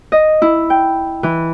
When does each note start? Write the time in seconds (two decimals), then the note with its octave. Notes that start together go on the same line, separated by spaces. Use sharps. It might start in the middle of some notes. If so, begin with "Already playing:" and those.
0.12 D#5
0.42 E4
0.70 G5
1.23 E3